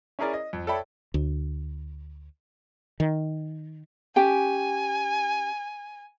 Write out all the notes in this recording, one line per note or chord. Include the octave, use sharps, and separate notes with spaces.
C#4 E4 G#4 A#4 D5
D#5
F2
A4 C#5 D5 E5 G5 B5
D2
D#3
C#4 G4 G5 G#5